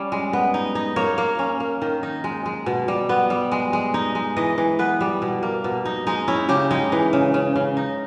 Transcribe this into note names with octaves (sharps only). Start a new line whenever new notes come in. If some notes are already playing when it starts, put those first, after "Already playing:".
Already playing: G3 C#4
G#3
B3
D#4
D#4
A#3 C#5
A#3
C#4
A#3
D#3
D#4
G#3
G#3
B2
G3
B3
G3
G#3
G#3
D#4
G#3
E3 D#5
E3
B3 B4
G3
B2
A#3
B2
D#4
G#3 D#4
C#4 E4
C#3 G4
G#3 D#4
E3
C#3
C#3
C#3
D#4